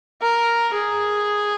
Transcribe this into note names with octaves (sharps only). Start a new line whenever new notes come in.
A#4
G#4